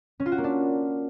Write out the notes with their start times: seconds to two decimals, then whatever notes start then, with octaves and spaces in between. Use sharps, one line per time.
0.20 C#4
0.26 F4
0.32 F#4
0.38 A#3
0.44 D4